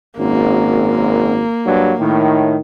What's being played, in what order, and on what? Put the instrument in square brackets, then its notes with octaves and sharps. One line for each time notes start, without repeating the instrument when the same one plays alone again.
[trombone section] G#1 F#2 [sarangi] A#3
[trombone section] G2 F#3
A2 D#3